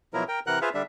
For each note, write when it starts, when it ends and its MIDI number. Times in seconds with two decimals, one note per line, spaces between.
0.14 0.24 47
0.14 0.24 53
0.14 0.24 54
0.14 0.24 64
0.14 0.24 70
0.28 0.40 70
0.28 0.40 79
0.47 0.59 48
0.47 0.59 52
0.47 0.59 70
0.47 0.59 78
0.47 0.59 90
0.61 0.69 65
0.61 0.69 68
0.61 0.69 71
0.61 0.69 72
0.61 0.69 76
0.61 0.69 77
0.74 0.82 50
0.74 0.82 55
0.74 0.82 62
0.74 0.82 76